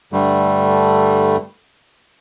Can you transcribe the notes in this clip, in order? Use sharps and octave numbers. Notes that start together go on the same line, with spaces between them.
G2 D3 G3 A3